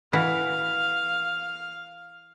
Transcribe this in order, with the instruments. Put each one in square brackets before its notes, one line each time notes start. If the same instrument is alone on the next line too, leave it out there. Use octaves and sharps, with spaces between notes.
[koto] E3 E4 F#4 [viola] F5